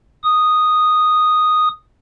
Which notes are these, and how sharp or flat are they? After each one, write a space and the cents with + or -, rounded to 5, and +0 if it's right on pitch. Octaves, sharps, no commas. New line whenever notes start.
D#6 -5